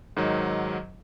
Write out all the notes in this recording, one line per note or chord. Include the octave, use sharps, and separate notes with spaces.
G#2 D#3 F#3